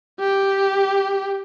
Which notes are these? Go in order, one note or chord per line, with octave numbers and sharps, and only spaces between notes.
G4